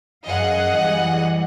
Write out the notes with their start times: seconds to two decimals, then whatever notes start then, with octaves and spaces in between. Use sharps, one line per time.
0.25 F#2 G#4 D#5 F5 F#5
0.71 E3 G3